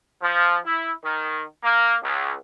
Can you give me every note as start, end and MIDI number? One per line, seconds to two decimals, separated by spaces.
0.22 0.57 53
0.65 0.91 64
1.03 1.43 51
1.63 1.96 58
2.03 2.33 37